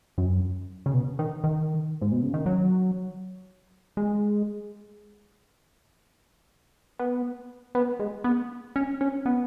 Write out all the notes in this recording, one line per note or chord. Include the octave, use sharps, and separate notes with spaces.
F#2
C#3
B2
D#3
D#3
G#2
B2
C#3
D#3
F#3
G#3
B3
B3
G#3
B3
C#4
C#4
B3